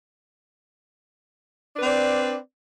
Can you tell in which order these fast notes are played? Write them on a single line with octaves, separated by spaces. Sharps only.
D4 B4 C4 D5